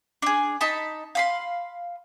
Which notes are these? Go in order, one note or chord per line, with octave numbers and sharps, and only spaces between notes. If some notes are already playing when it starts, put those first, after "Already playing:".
D4 G#4
D#4 A5 B5
F5 B5 C6